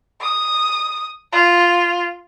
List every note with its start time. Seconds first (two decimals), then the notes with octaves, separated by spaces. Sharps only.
0.21 D#6
1.33 F4